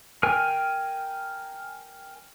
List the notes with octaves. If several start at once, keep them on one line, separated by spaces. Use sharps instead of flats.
A#4 G5 G#5 F6